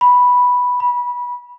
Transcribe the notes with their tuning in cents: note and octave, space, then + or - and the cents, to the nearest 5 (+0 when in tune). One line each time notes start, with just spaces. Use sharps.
B5 -5
B5 -20